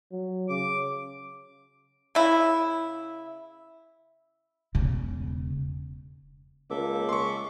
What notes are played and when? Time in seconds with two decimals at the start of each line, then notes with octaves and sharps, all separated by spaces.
0.11 F#3
0.49 C#3 D6
2.15 C#3 E4
4.75 E1 C#3
6.70 C#2 A#3 A4 E5 D6
7.09 G#3 C6 C#6